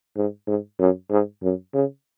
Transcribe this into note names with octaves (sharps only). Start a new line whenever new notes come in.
G#2
G#2
F#2
G#2
F#2
C#3